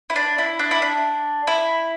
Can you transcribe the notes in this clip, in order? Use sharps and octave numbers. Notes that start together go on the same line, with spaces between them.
E4
D4
E4
D4
E4
D4
E4